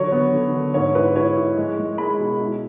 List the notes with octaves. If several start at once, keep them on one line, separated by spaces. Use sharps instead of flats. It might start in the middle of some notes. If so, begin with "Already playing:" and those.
Already playing: D3 F#3 C#5
B3
D3
D3
G#2 C#5
E4 B4
E4 C#5
E4
G#3
G#3
G#3 B5
B2
E4